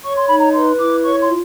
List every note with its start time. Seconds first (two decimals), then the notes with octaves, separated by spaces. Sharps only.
0.04 C#5 C#6
0.17 C6
0.29 D#4 B5
0.41 A#5
0.53 B4 C6
0.79 E4 D6
1.03 C#5 C#6
1.21 C6
1.29 F4